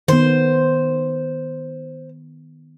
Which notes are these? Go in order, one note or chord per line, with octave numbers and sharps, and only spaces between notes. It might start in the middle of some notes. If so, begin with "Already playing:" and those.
D#3 B3 C5